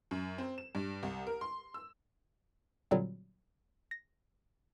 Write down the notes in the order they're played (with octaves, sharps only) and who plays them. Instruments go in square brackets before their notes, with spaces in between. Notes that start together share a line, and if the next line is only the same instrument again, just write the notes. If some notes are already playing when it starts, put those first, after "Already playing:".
[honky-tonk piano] F#2
C4
E7
G2
C2
A#4
C6
E6
[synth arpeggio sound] A#2 D3 F#3 G3 C4
A#6